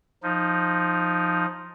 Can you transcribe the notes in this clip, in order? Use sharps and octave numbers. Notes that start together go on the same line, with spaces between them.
F3 D#4